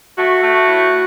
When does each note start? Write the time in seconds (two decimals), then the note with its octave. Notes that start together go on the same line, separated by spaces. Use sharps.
0.17 A3 F#4
0.42 A3
0.67 A2